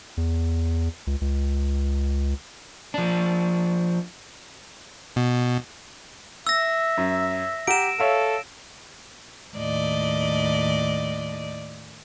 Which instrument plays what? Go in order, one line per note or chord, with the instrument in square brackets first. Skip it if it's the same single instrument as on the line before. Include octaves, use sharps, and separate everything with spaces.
[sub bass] E2
C#2
C#2
[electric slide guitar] F3 D4
[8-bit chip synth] B2
[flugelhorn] E5 [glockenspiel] E6 A#6
[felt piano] F#2
[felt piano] G4 F#5 A#5 [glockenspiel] D7 E7
[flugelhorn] A4 [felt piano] C#5 E5 F5
[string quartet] D#2 A2 D5 D#5